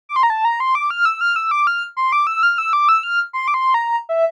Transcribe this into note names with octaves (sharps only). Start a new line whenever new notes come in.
D6
C6
A#5
A5
A#5
C6
D6
F6
E6
F6
E6
D6
F6
C6
D6
E6
F6
E6
D6
E6
F6
C6
D6
C6
A#5
E5